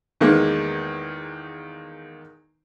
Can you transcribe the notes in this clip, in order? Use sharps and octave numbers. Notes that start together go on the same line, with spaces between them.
E2 D#3 G#3 A#3